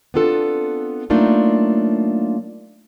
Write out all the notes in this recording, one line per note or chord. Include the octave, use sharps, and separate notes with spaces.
B3 C4 D4 F4 A4
F#3 A3 A#3 D4 D#4 F4